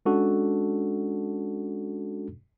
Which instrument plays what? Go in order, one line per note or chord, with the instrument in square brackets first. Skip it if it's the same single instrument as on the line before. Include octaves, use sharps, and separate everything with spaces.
[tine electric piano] G#3 C#4 D4 F#4 A4